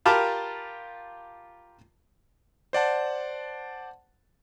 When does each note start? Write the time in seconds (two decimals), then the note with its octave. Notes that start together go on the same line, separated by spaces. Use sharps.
0.05 F4 G4 A#4 A5 B5 D6
2.73 C5 D5 F#5 A5